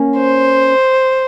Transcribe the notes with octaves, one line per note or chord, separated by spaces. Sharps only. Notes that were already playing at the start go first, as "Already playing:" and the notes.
Already playing: A#3 C#4
C5